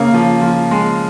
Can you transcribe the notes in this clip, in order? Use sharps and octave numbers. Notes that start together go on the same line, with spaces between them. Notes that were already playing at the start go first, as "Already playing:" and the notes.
Already playing: C#3 A#3
F3
F3
G#3